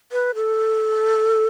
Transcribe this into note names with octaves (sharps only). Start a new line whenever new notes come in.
B4
A4